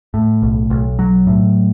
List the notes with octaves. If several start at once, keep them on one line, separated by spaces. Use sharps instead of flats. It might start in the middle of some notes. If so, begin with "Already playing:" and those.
A2
B1
B1
F#3
A2